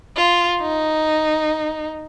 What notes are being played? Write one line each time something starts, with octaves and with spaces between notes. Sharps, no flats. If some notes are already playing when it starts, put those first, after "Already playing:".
F4
D#4